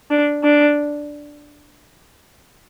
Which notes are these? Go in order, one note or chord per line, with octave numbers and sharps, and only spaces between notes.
D4
D4